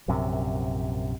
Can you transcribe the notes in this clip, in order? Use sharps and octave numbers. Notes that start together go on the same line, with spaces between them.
A#1 F#2 C3